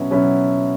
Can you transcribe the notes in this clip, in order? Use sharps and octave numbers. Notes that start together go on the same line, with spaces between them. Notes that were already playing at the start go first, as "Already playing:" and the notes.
Already playing: B2 F#3 C#4 E4
B2 F#3 C#4 E4